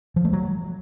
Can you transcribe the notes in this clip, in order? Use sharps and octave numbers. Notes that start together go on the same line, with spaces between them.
F3
A3
F#3